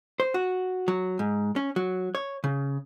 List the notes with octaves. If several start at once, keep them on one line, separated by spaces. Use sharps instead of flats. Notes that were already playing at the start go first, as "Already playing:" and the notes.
C5
F#4
F#3
G#2
C#4
F#3
C#5
C#3